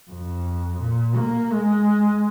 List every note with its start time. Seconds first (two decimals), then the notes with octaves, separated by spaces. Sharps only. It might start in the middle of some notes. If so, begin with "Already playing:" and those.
0.11 F2
0.81 A#2
1.16 A#3
1.52 G#3